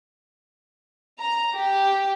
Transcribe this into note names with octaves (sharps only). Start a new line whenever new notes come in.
A#5
G4